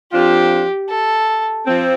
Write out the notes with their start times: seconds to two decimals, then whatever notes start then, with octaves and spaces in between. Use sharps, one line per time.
0.12 F2 F3 D4 F4 G4
0.89 A4
1.67 F2 F3 C4